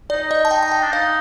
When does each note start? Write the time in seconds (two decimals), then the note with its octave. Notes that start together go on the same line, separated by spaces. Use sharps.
0.10 D#4 D5
0.31 D#5
0.45 A5
0.51 D#4 G5
0.63 A5
0.71 G5
0.83 D4
0.92 D#4 F5